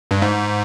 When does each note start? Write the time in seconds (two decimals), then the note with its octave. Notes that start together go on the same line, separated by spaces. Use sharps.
0.11 G2
0.22 G#2